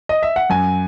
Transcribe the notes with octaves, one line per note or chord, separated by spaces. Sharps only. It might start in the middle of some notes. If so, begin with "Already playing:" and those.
D#5
E5
F#5
F#2 G#5